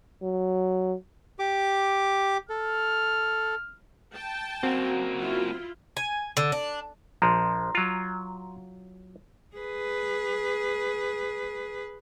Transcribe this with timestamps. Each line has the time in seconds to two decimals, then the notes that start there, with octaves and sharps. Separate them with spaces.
0.22 F#3
1.39 G4 D6
2.49 A4 F6
4.14 G5 A5
4.63 F#2 A#3 C4 F#4
5.16 E4 F4
5.97 G#5
6.37 D3
6.52 D4
7.22 A#1 F3 A#5 C6
7.75 F#3 F4
9.56 G#4 B4